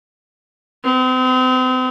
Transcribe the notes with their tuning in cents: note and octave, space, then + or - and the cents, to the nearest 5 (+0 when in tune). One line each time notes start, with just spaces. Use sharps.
C4 -40